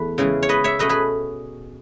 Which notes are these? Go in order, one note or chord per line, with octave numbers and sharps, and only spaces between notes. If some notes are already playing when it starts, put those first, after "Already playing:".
Already playing: E2 A3 B4
C#3 E3 G#3 C#4
C#5
B4 D#5
C#5 E5
B2 A3 C#4 B4 D#5
G#4 B4